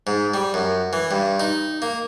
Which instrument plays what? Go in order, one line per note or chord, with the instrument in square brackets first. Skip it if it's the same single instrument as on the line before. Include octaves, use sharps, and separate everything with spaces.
[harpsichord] G#2
G3
F#2
E3
G2
D#4
A#3